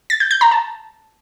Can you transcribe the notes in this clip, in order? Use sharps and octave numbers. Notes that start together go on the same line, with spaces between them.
A6
G6
G6
A#5
A5